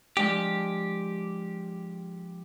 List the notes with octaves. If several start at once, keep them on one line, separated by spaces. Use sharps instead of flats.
F3 G#3 D4 G4